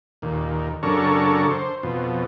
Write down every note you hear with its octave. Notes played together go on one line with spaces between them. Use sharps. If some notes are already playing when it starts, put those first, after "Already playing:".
D#2 A#2
F#2 C#3 D4 A4 A#4 C#6
C5
F2 B2